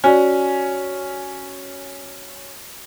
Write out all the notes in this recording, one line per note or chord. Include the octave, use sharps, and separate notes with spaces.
C#4 F#4 D5